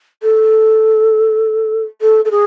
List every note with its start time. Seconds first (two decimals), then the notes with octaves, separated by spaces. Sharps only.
0.22 A4
2.01 A4
2.25 A4
2.31 G#4